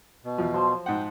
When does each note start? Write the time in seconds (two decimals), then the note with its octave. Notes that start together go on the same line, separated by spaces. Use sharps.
0.24 B2
0.38 E2 F3
0.54 F3 F#3 C6
0.86 G#2 F#5 G5